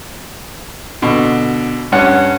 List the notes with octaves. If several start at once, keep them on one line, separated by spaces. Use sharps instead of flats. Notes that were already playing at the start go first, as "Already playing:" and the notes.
B2 D3
G2 C#4 C#5 F#5